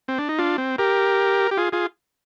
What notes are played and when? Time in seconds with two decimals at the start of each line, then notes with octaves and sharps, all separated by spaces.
0.08 C4
0.18 D4
0.29 D#4
0.38 D4 F4
0.58 C4
0.78 G4 A#4
1.51 G4
1.57 F4 G#4
1.72 F4 G#4